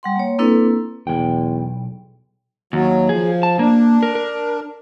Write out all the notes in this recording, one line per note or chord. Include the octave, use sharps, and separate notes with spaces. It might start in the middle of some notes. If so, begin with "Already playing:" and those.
G3 F#5 C6
A#3 C#5
A#3 C4 D4 E4 A4 B4
B1 E2 A#2 G5
D#2 F#3
F3 G#4
A5
A#3 D4
A#4
A#4